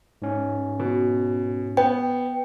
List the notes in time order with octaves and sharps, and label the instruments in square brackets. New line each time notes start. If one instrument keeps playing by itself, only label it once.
[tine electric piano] G#2 C#4
[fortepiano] B2
[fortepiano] B3 [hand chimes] G5